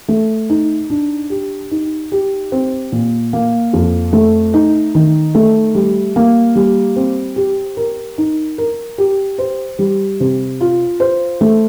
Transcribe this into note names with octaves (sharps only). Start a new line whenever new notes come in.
A3
D#4
D4
G4
D#4
G4
C4
A#2
A#3
F2
A3
D#4
D#3
A3
G3
A#3
G3
C4
G4
A#4
D#4
A#4
G4
C5
G3
C3
F4
C5
A3